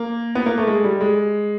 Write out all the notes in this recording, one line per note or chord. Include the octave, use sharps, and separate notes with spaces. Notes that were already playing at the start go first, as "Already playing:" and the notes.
Already playing: A#3
B3
A#3
A3
G#3
G3
G#3